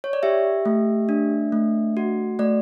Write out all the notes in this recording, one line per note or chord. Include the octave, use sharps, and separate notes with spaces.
C#5
D5
G4 E5
A3
D4
A3
F#4
A3 D5